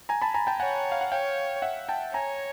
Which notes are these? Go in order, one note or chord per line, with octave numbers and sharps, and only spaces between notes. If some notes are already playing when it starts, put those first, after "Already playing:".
G#5 A#5
A5 B5
G#5 A#5
G5 A5
C#5 F#5 G#5
F5
F#5
C#5 F5 G5
E5 F#5
G5 A5
C#5 G#5 A#5